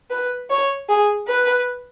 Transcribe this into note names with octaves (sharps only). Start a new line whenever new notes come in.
B4
C#5
G#4
B4